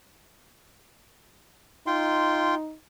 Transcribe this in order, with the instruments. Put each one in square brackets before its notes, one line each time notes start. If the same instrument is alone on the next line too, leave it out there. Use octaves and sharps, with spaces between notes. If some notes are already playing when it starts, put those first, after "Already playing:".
[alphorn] D#4 [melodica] F4 G5 C6